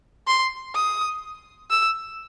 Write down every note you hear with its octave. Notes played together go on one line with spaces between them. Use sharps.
C6
D#6
E6